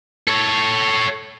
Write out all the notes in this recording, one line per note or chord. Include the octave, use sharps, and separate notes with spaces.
A4 C#5